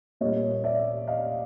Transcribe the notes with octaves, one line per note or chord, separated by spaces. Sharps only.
A#2 G3 A#3 C#5 D#5
D5 E5
D#5 F5